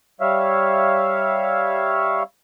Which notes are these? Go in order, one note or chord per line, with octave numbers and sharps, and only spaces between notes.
G3 C#5 E5 F5